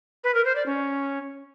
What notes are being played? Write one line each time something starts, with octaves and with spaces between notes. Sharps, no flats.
B4
A#4
C5
D5
C#4